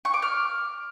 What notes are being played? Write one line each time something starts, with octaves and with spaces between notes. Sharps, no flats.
C#6
D6
F6